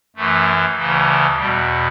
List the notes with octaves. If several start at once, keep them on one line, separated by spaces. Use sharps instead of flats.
F#2 E3 A3
D2 C#3 E3
E2 B2 G3